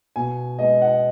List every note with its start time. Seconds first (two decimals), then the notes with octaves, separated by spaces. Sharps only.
0.16 B2 G#5
0.59 G#3 B3 D#5
0.82 F#5